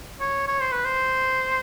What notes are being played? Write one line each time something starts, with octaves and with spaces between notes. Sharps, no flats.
C#5
C#5
C5
B4
C5